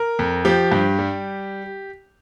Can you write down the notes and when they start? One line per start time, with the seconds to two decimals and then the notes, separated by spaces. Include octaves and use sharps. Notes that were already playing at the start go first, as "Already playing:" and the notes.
Already playing: A#4
0.19 F2
0.45 F3 G4
0.72 G2
0.99 G3